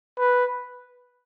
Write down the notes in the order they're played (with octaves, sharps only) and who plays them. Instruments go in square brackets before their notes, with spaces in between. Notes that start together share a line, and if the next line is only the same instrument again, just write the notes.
[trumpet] B4